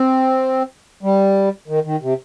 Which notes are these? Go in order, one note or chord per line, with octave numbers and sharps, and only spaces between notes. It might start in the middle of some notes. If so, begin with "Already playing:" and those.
Already playing: C4
G3
D#3
D#3
C3